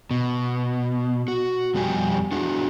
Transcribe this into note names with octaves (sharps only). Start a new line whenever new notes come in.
B2
F#4
F2 B2 G3 G4 G#5
D4 F#4 G#4